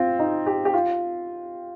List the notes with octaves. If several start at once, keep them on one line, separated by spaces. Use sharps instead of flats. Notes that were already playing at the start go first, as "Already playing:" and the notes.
Already playing: C4 F4
D#4
G4
G4
F4